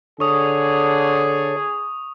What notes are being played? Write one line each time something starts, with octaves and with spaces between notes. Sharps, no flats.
D3 G#4 A4 C#5 C#6 D#6